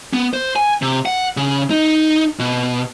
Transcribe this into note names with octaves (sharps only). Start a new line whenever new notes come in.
B3
C5
G#5
C3
F#5
C#3
D#4
B2